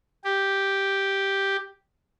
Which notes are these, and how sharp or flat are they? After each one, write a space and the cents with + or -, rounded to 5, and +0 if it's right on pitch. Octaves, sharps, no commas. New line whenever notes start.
G4 +0